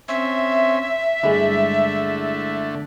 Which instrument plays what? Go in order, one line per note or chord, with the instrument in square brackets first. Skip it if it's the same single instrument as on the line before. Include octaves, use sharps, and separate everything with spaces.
[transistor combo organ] C4 C#4 G#5 [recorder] E5
[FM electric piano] G2 G#3 E4 [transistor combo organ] D3 A3